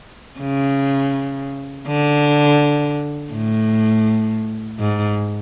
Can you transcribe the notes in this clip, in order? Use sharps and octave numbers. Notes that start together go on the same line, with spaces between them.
C#3
D3
A2
G#2